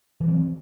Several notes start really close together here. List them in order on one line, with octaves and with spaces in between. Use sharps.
E3 F#3 C4